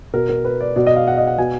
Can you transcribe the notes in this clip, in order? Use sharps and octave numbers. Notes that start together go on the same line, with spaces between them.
B2 A#4
A#4
B4
D5
B2 D5
D#5
F5
F#5
D#5
F#5
B2 G#5